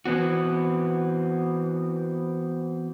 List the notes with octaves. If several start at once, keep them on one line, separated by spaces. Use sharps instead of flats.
E3 B3 C4 F#4